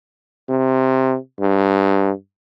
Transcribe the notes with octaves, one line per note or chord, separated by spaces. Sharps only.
C3
G2